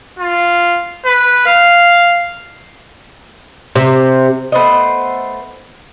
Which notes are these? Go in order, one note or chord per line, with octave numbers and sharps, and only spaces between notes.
F4
B4
F5
C3
A3 B3 C5 D#5